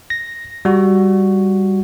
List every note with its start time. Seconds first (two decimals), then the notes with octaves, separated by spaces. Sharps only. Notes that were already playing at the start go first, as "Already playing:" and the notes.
0.10 A#6
0.65 G3 F#4